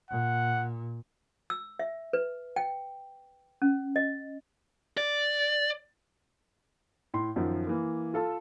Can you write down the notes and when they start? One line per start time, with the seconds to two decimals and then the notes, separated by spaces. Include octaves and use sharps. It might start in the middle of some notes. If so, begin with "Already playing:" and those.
0.10 A#2 F#5
1.50 E6
1.79 E5
2.13 B4
2.56 G5
3.62 C#4
3.96 D#5
4.97 D5
7.14 A2 C6
7.36 F#2 D#3 F3
7.67 E3 A#3
8.14 F4 A4 A5